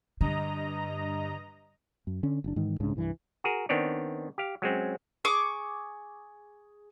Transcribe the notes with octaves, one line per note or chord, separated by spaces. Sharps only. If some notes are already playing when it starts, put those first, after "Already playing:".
G2 D3 D#5 A#5
F#2
D3 C#4
F#1 D4
G#2 D#3 E3
C2 G#2 C#3 D4
C2 G2 E3
F#4 G#4 A#4
D#3 B3 C4 D4 C#5 D5
G4 F5
F#3 G#3 C4 C#4
G#4 C#6 D6